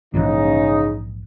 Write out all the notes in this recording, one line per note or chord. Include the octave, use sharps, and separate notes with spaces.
A#1 G#2 C#3 E3 D#4